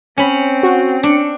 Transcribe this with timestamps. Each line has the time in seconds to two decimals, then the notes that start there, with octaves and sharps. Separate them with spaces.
0.18 C4 C#4 B5
0.63 F#4
1.03 D4 C#7